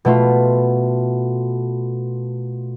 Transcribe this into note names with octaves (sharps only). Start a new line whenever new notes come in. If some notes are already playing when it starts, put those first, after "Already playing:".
B2 A3 F4